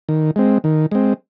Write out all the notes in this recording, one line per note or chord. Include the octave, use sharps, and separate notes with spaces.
D#3
G#3 C4
D#3
G#3 C4